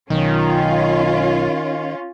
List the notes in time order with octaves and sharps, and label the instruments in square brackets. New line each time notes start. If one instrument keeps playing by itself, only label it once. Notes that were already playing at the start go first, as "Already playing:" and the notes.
[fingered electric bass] B1 [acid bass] D#3 [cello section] C#4 F4